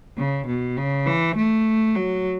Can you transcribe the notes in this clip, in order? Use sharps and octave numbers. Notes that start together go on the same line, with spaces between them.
C#3
B2
C#3
E3
A3
F#3